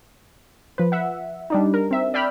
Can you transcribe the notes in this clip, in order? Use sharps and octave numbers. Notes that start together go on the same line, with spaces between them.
F3 B4
E5 F#5
G3 D4 D#4
A#4
C4 E5
D5 E5 G5 B5 F6